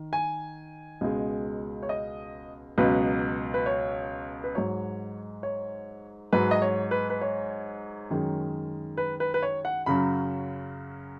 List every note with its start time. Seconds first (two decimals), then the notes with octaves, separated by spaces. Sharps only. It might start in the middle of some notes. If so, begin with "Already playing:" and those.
Already playing: D#3
0.13 G#5
1.01 C#2 B2 G#3
1.83 C#5
1.89 D#5
2.78 C#2 B2 F#3 B4
3.54 B4
3.66 C#5
4.44 B4
4.55 G#2 F#3 C#5
5.43 C#5
6.33 G#2 F#3 B4
6.51 D#5
6.62 C#5
6.91 B4
7.10 B4
7.21 C#5
8.10 F#2 D#3 G#3
8.97 B4
9.20 B4
9.34 B4
9.42 C#5
9.65 F#5
9.86 F#2 C#3 F#3 B5